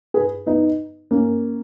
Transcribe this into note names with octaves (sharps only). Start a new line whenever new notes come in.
G#4 B4
B3 D#4
A#3 C#4